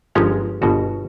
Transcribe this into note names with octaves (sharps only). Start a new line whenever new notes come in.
G1 F3 G#3 C#4 A#5
G1 B2 F#4